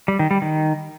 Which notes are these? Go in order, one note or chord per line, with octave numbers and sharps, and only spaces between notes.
G3
D#3
G3
D#3